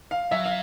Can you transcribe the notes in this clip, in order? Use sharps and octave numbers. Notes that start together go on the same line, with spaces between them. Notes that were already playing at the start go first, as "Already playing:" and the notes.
F5
F#3 E5
F5